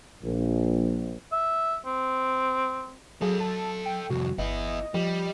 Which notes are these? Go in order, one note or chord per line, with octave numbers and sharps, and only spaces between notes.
A#1
E5
C4
F#3 G#4 A4 F5
A5
G5
C2 F2 F#4
G1 B3 E4 D#5
F3 G3